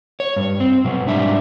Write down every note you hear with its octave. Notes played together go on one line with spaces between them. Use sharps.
C#5
G2
C4
B2 F#3
G#2 G3 D4 E5